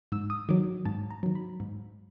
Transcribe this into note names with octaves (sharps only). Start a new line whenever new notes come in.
G#2 E6
D#6
D#3 F#3 D6
G#2 A5
A#5
D#3 F#3
B5
G#2